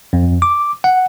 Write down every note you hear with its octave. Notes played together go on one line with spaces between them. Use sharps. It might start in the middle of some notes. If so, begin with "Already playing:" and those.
F2
D6
F#5